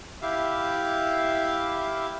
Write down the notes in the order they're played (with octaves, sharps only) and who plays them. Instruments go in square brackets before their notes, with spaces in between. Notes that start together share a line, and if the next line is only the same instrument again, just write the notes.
[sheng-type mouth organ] E4 G4 E5 F5